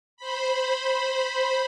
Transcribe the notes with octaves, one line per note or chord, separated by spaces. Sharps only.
C5 B5